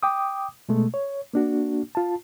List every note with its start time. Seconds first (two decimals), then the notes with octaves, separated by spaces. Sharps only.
0.03 G5 D6 D#6
0.69 B2 G#3 A3
0.94 C#5
1.34 A#3 D4 F#4
1.95 F4 A5